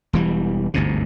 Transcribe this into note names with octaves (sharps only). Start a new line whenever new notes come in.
E1 E3 G3
G1 D2 G#2 C3